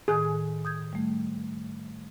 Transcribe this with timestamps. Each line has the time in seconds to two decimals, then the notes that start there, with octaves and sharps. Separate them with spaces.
0.08 A2 D#3 G#4
0.65 D#6 G6 G#6
0.93 G3 A3